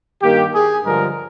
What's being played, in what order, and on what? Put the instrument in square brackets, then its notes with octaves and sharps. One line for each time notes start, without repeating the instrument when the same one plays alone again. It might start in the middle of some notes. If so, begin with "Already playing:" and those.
[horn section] G2 D#3 A#3 G4
G#4
G2 D3 F3 G#3 A#4